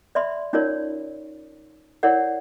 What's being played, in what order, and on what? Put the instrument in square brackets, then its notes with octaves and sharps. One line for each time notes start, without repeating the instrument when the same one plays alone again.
[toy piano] D5 E5 B5 C6
C#4 D#4 F4 A#4 C#5 D5
E4 A#4 C#5 D5 F#5